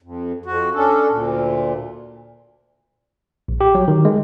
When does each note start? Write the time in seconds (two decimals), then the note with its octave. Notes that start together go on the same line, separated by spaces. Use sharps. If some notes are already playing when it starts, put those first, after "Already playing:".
0.02 F2
0.46 F2 F#4
0.75 C#4 D4 A4
1.10 D2 A#2
3.48 A#1
3.61 G4
3.75 F#3
3.88 D#3
4.05 G#3